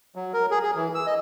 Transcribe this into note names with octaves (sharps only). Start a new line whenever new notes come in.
F#3
A#4
G#4
G#4
E3
E6
D#5